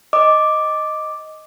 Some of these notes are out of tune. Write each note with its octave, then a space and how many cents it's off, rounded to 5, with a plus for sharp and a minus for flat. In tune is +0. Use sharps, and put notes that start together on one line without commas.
D#5 +0 D6 +0